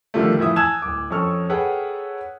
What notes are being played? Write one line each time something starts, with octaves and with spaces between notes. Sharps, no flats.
D3 D#3 F3 G3 A3
A2 E3 F3 E5 D#6
G#5 A5 E6 F#6 G#6 E7
D1 D6
F2 C#4 A4 C#6 F6
G#4 A4 B4 C#5 F#5 G5